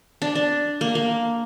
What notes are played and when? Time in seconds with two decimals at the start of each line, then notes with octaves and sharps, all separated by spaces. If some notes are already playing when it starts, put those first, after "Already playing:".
0.22 D4
0.35 D4
0.81 A#3
0.95 A#3